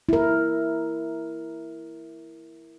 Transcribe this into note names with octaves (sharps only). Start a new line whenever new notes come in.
E4 A#4